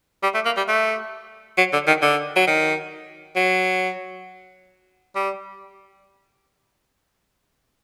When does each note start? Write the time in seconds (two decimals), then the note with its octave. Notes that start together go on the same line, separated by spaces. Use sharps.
0.23 G3
0.35 A3
0.45 A#3
0.57 G3
0.68 A3
1.58 F#3
1.73 D3
1.87 D#3
2.02 D3
2.36 F#3
2.47 D#3
3.36 F#3
5.16 G3